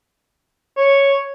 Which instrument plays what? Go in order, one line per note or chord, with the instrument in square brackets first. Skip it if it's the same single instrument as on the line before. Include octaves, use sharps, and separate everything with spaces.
[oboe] C#5